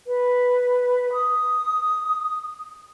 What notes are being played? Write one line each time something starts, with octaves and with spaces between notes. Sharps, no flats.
B4
D#6